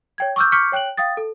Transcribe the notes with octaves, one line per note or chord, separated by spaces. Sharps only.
C#5 G5 G#6
C#6 D6 E6 F6 G6
C#6 D6 F6 G6 B6 C#7
C#5 G5 F#6 D7 F#7
F5 G5 D#6 A6
A4